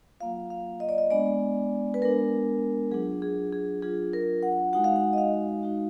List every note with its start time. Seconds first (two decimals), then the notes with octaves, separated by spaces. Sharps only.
0.20 F#3 A#3 F4 F5
0.50 F5
0.80 D#5
0.89 D5
0.98 D#5
1.11 G#3 B3 D4 D5
1.94 B4
2.02 G#3 B3 D4 A#4
2.91 F#3 D4 F4 G#4
3.22 G#4
3.53 G#4
3.82 F#3 D4 F4 G#4
4.13 A#4
4.43 F#5
4.73 G#3 D#4 F#4 F#5
4.84 F5
4.96 F#5
5.13 D#5
5.18 F5
5.63 G#3 D#4 F#4